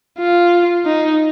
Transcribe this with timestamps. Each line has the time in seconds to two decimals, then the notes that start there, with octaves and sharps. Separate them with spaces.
0.18 F4
0.86 D#4